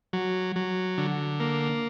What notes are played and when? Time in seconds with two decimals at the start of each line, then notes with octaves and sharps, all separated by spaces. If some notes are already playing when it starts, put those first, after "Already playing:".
0.13 F#3
0.56 F#3
0.98 D3
1.40 A#3